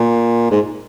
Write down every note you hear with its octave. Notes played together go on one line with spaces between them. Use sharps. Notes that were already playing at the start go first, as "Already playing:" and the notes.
Already playing: A#2
G#2